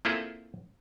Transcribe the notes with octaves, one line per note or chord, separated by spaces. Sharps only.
A#3 C4 E4 F4 G#4 A4